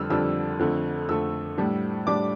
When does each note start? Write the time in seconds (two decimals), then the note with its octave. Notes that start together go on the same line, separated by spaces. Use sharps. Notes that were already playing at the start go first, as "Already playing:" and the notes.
Already playing: F2 D3 G3 D4 E6 F6
0.10 F2 D3 G3 D4 E6
0.59 F2 D3 A3
1.09 F2 D3 A3 E6
1.58 A2 G3 D4
2.07 A2 G3 D4 D6